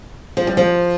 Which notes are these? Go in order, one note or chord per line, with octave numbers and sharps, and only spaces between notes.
F3
G3
F3